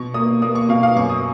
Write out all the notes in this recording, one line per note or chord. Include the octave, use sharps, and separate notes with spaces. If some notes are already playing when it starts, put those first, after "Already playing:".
Already playing: B2 C#6
A#3 D#6
A#3 D#6
C#6
B2 F5
F5
F#2 C#6
D#6